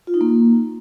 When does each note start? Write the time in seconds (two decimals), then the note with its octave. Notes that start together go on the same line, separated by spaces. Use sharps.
0.07 F4
0.14 D#4
0.21 A#3